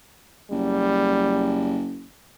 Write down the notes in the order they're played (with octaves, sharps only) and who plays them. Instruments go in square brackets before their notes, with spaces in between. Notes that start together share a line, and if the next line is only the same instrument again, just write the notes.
[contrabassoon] F#1 [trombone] G3